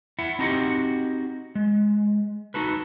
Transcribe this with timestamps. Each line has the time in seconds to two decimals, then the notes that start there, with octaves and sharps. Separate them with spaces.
0.19 E4 E5 F#5
0.39 C4 D#4 F#4 G4 D#5 F#5
1.55 G#3
2.54 D#4 F#4 A4 B4